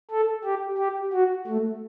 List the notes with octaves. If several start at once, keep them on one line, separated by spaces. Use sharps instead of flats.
A4
G4
G4
F#4
A3